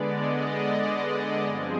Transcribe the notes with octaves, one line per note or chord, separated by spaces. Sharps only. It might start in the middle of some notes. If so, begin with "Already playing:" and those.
Already playing: D3 G#3 B3 D5
D#5
D5
D5
G2 F3 C4 G#4